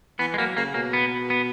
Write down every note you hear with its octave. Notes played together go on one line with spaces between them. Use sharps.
E3 B3
G#3
F#3 A#3
C#3 A#3
B2 A#3
B3
B3